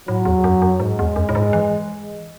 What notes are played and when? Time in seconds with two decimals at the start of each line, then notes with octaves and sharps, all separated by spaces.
0.08 A2 F#3
0.25 E2
0.44 F#2
0.62 F#2
0.80 G#2 G#3
0.99 E2
1.16 F#2
1.29 A2
1.35 G#2
1.53 E3